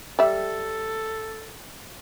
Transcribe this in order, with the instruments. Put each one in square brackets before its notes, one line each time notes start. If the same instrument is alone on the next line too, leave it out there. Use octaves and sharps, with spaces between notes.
[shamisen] G3 E5 [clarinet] A4